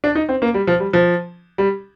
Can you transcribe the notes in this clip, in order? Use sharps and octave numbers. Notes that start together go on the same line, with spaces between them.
D4
D#4
C4
A#3
G3
F3
G3
F3
G3